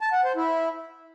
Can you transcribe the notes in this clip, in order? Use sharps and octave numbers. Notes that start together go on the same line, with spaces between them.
A5
F#5
C5
E4